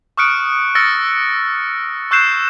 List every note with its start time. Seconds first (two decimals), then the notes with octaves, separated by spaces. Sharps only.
0.17 C#6 D#6 F6 F#6 C#7 D7
0.75 E6 F6 A6 A#6 C#7
2.11 C#6 E6 F#6 G6 C7 E7